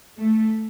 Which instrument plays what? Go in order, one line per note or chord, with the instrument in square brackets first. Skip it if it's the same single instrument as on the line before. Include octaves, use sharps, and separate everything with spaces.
[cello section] A3